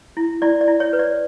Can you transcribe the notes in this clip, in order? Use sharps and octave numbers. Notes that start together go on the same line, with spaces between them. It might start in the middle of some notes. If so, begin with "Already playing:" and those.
E4
E4 D5
D5
E4
C#5
B4
D5